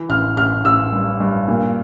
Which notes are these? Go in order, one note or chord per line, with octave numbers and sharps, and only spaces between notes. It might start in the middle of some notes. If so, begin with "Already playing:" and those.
Already playing: E3
A1 F6
A1 F6
A1 E6
G2
G2
A#2